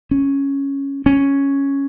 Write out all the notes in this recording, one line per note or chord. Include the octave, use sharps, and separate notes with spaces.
C#4
C#4